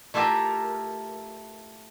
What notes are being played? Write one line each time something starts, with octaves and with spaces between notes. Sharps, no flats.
A3 E4 F4 G4 A4 A#4